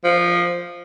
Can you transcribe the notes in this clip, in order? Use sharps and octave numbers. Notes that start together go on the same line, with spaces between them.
F3